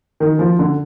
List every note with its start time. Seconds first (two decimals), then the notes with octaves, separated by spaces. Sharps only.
0.20 D#3
0.39 F3
0.59 D3